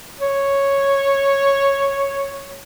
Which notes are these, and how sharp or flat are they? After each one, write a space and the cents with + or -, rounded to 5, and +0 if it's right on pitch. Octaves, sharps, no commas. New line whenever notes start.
C#5 -5